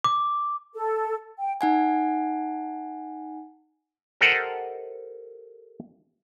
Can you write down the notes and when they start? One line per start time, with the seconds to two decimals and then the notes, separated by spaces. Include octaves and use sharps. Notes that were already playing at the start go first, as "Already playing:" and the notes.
0.04 D6
0.75 A4
1.38 G5
1.61 D#4 F#5 G#5
4.21 G4 A4 A#4 C5 D#5 F#5